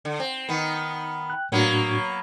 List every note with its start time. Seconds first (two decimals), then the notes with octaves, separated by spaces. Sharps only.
0.05 D3
0.20 C4
0.49 D#3 B3
1.30 G5 F#6
1.52 A2 F#3 A#3 B3 D4 F#4